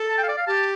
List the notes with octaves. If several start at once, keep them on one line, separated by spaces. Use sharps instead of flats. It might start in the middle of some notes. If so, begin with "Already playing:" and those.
Already playing: A4
A5
G5
F5
D5
F5
G4 A5